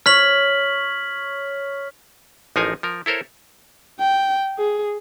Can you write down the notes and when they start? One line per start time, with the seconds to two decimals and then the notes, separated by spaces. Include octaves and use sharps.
0.06 C#5 F6 B6 F#7
2.56 A1 F3 D#4 G#4 A#4 G#5
2.83 F3 A#4
3.06 E4 A4 A#4 C5 C#5
4.00 G5
4.58 G#4